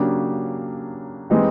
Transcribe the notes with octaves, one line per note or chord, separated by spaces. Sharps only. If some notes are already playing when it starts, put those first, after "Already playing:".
Already playing: C#3 F#3 A#3 D4 G4
E3 G#3 C4 D#4 G4